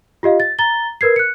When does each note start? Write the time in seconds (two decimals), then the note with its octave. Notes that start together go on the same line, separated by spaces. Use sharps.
0.23 F4 G4 D#5 F5
0.40 A6
0.59 A#5 A6 G7
1.01 A#4 B4 G#6 C7
1.16 F#6 C#7